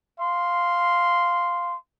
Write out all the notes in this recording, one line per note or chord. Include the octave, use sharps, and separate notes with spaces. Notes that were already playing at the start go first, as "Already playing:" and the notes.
F5 C6